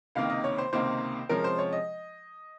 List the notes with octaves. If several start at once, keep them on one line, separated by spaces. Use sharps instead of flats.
C#2 C3 D#3 A#3 F5
D#5
C#5
C5
C#2 C3 D#3 A#3 C5
C3 F3 G#3 C#4 A#4
C5
C#5
D#5